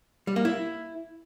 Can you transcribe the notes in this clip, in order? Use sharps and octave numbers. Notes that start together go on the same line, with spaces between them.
G3
A#3
E4